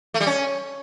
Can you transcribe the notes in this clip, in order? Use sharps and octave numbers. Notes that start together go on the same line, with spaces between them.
A3
G3
C#4